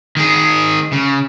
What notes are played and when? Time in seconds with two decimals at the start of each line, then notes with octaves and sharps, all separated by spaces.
0.17 D#3 G#4
0.93 C#3